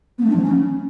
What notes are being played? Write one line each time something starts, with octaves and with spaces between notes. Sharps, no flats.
B3
A3
D4
F3
C#4